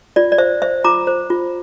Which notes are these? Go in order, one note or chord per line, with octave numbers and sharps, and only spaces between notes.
F4 D5
D5
C5 E5
C5 E5
F4 A#5 D6
C5
F4